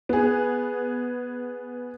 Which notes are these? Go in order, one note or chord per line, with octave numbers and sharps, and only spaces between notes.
B3 G#4